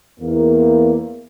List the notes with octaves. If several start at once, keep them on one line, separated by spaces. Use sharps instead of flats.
E2 A#3